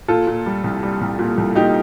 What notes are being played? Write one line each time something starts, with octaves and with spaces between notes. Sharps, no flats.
A#2 F4 A4
A#2
G3
C2
G3
C2
A#2
C2
A#2 D#4 G4